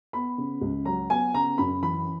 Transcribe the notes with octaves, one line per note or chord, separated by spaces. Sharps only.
B3 B5
C#3
C#2
F#3 A#5
B3 G#5
C#3 A#5
F#2 B5
E3 B5